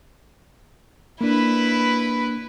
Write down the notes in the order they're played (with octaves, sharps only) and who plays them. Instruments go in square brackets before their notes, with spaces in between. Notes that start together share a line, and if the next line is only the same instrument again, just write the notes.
[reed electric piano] A#3 D4 [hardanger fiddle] E4 B4